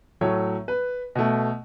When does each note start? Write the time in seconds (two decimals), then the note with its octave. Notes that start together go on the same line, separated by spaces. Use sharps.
0.21 A2 F#3 A3 C#5
0.68 B4
1.15 B2 A3